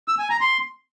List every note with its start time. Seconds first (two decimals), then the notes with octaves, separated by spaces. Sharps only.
0.08 E6
0.19 G#5
0.30 A#5
0.41 C6